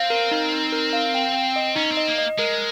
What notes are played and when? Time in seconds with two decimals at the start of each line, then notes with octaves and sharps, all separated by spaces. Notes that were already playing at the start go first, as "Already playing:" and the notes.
Already playing: C4 F5
0.10 A#4
0.31 D#4
0.52 D#4
0.72 A#4
0.93 F5
1.15 G5
1.34 G5
1.56 D#5
1.76 C#4 D#4
1.92 C4
1.97 D#5
2.08 A#3
2.18 D#5
2.39 G#3 A#4